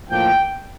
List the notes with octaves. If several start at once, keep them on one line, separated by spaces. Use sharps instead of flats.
A2 F3 A#3 D4 F4 G5